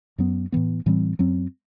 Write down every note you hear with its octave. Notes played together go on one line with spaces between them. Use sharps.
F#2 F#3 B3
A2 E3 B3
A2 E3 G3 C4
F#2 F#3 C4